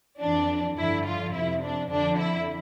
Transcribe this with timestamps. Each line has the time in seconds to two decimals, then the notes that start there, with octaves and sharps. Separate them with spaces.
0.21 F2 E3 D4
0.77 G2 D3 F3 E4
1.06 F4
1.33 F2 C3 F3 E4
1.62 D4
1.90 F2 D3 F3 D4
2.18 E4